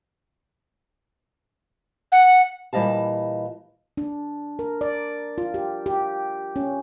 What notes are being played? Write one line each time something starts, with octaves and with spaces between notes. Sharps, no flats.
F#5
A#2 E3 G3 D#5 F5 A5
D4
A#4
D5
F4
G4
G4
C#4